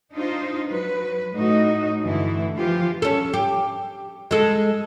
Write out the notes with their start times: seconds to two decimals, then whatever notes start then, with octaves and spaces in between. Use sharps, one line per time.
0.12 D4 D#4 F4 C5
0.66 F#3 B4
1.36 A2 D#4 F#4 D#5
2.02 G2 D3 E3 A3 E4
2.57 E3 F3 F4 G4
3.02 C#4 A4
3.34 G4
4.31 G#3 A4